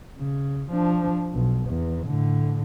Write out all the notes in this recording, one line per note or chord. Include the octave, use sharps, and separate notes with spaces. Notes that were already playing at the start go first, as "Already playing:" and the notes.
C#3
F3 D4
B1
E2
A2 D3